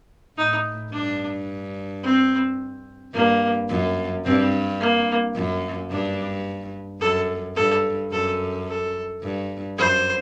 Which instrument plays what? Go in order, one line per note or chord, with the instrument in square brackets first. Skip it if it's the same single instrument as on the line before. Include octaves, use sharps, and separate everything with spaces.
[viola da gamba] A2 [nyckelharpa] D#4
[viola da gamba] G2 [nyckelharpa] D4
[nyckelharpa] C4
[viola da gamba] G2 [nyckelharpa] A#3
[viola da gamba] F#2
[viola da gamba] G2 [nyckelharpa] C4
[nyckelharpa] A#3
[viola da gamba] F#2
[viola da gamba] G2 [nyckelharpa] D4
[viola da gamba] F#2 [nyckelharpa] A4
[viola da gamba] G2 [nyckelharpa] A4
[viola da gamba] F#2 [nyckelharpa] A4
[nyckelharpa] A4
[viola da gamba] G2
[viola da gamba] F#2 [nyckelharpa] C5